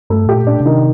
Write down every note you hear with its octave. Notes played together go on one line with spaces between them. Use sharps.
G2 A3
A2 G4
A#2
D4
C3
D#3